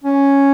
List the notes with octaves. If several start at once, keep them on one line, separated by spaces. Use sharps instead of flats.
C#4